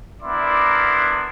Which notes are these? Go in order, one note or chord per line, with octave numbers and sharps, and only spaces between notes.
B3 D4 E4 A#4 D5 C6